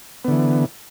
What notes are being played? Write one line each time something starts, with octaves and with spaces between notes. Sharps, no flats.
D3 E3 B3